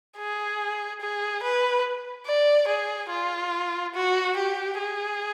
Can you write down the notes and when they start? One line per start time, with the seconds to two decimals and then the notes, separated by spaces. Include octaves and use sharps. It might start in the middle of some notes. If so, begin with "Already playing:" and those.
0.18 G#4
1.01 G#4
1.43 B4
2.26 D5
2.68 G#4
3.11 F4
3.95 F#4
4.37 G4
4.78 G#4